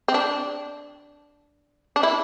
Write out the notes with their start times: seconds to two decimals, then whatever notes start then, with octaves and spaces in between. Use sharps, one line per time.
0.08 C4
0.14 D4
1.96 D4
2.03 E4